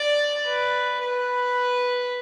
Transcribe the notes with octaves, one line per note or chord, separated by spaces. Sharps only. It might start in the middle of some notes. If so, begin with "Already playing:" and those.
Already playing: D5
B4
B4